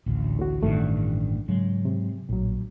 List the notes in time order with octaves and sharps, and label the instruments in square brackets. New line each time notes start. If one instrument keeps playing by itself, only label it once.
[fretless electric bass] A1 D2
[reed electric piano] A2 F#4
[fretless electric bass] A1 G2 [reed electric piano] C3 D#3 A3
[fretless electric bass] G#2 F#3 G#3 [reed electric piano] C#3
[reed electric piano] C3
[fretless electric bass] A#1 [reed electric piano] A2 F#3